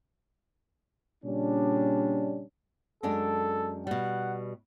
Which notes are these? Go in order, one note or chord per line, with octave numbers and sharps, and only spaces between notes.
A#2 C#3 G3 C#4 D4
F#2 G#3 D4 A4
B2 G3 F#5